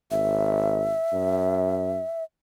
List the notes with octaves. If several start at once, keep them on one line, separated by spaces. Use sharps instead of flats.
G#1 E5
F#2